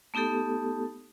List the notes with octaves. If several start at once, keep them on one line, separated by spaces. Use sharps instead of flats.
A3 B3 D#4 G4 A4